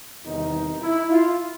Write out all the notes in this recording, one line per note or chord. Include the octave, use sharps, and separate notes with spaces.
E2 C3 D#3 G3 D#4
E4
F4